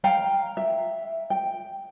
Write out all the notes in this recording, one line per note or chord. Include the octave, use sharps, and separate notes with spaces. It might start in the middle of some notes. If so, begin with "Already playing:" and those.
F5 G5 A#5
E5
G5